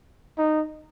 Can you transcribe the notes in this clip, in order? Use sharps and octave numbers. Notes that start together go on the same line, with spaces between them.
D#4